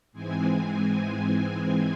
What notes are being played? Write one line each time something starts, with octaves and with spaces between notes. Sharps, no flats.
G#2 E3 G#3 C4 G#5